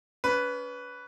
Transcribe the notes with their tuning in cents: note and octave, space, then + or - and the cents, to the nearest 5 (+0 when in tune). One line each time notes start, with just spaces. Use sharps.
C#4 +40 B4 +0